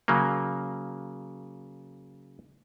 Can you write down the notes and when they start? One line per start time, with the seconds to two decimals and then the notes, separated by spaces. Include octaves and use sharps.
0.08 C#3 F#3 A#3